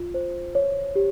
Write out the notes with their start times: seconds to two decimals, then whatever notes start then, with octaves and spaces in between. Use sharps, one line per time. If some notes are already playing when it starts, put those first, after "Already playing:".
Already playing: F4
0.14 C5
0.55 C#5
0.96 G4